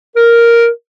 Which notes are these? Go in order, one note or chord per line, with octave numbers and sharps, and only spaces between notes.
A#4